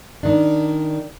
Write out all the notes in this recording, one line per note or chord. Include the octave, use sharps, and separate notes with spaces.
D#3 D4